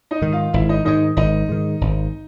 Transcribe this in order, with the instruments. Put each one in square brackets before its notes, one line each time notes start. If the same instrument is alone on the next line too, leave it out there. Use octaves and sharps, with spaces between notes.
[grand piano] D#4 D#5
[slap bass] G#2 D#3
[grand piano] F4 F5
[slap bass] G#1 [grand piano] E4 E5
[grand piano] D#4 D#5
[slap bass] G#2 D#3 [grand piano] D#4 D#5
[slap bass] G#1 [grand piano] D#4 D#5
[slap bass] G#2 D#3
G#1